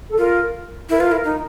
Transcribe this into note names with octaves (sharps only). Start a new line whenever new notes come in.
A4
F4 A#4
E4 A#4
B4
F4 A#4
E4 A#4
D#4